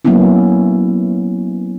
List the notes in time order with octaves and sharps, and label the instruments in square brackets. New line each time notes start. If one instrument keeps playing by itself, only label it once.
[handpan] F#3 A#3 B3 C#4 E4